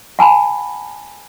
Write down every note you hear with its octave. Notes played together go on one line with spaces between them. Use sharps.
F#5 G#5 A5 B5